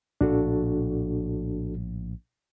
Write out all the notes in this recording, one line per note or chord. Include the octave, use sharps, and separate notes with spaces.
A#1 A2 D4 F#4 A4